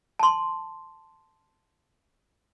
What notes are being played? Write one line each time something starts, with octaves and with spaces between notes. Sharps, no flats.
A5 C6